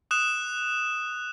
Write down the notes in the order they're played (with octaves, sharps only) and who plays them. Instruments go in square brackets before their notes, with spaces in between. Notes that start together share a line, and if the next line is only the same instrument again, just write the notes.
[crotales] D#6 F#6 E7